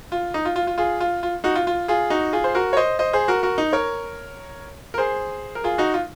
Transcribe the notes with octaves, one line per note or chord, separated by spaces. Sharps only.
F4
D#4
F4
F4
F4
F4 G#4
F4
F4
D#4 F#4
F4
F4
F4 G#4
D#4 F#4
F4 G#4
C5
F#4 A#4
C#5
C5 D#5
C5 D#5
G#4 C5
F#4 A#4
F#4 A#4
D#4
A#4 C#5
A#4
G#4 C5
A#4
F4 G#4
D#4 F#4
F4